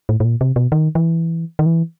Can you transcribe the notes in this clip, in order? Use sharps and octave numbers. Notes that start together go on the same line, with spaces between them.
A2
A2
A#2
C3
B2
D#3
E3
D#3
E3